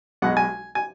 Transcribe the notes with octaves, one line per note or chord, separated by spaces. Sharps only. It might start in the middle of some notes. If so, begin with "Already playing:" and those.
B1 B2 G#3 F#5
G#5
G#5